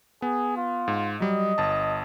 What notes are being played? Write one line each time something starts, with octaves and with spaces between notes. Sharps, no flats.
B3 G#4
F4
G#2
F#3 G3 D#5
G1 A5